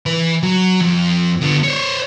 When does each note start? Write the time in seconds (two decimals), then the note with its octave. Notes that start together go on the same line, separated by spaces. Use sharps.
0.06 E3 B4
0.43 F#3
0.81 F2
1.41 D3 B3
1.63 C5 C#5